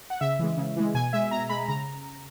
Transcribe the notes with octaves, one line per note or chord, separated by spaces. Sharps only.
F#5
C#3 E5
E3 G#3
C#3
E3 G#3
B2 G#5
G#3 E5
B2 A#5
G#3 B5
C#3 A#5